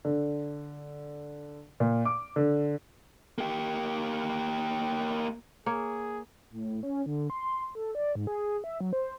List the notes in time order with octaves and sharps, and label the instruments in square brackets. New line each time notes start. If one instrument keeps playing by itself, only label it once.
[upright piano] D3
A#2
D6
D3
[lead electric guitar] A#3 G4
[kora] A#3 C#5 [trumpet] G#4
[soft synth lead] A2
C#4
D3
C6
A4
D5
G#2
G#4
E5
F#3
C5